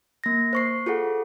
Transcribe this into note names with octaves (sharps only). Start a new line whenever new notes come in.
A#3 A#6
C5 C#6 C7
F4 G#4 A4 F#5